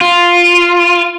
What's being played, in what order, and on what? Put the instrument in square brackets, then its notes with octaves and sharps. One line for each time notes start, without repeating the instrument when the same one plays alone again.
[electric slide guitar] F4